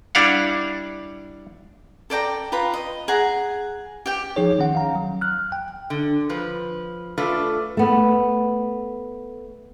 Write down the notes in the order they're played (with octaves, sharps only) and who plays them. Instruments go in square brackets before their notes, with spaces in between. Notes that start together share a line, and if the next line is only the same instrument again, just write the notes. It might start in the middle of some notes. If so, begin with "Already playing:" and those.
[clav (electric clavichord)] G3 D4 E4 F5 F#5
[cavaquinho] A4 D5 G5 A#5
F4 B4 A#5 B5
D#5
G#4 F#5 A#5
G4 G5
[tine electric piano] F3 D#4 G#4 C#5
D#3 C#4 F#5
F5 A#5
F#3
F6 F#6
G5
[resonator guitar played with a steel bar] D3
F3 B4
A3 D4 F4 A4 B4
[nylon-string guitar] A3 B3